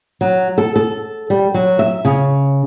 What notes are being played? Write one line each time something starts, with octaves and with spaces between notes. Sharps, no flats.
F#3
A4
A4
G3
F#3
E5
C#3